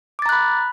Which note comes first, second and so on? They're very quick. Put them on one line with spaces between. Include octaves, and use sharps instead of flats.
D6 A6 A#5 F#6 B5